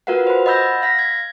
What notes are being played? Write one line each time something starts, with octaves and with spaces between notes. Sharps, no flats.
F4 F#4 A#4 B4 F5 F#5
C5 B5
D#5 F#5 B5 E6 G6 A#6
F5 A#6 B6
G#6